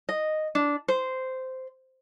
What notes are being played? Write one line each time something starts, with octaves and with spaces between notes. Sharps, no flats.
D#5
D4
C5